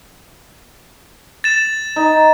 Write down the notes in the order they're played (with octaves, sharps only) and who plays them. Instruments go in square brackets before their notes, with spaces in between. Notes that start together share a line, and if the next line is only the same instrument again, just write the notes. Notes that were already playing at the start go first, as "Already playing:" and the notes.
[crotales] A6 E7
[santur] D#4